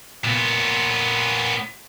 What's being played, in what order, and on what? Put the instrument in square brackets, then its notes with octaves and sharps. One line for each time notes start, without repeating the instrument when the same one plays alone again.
[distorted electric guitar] A#2 B3